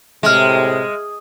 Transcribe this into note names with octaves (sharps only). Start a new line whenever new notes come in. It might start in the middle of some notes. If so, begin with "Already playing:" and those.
A2 C3 G#3 E5 F6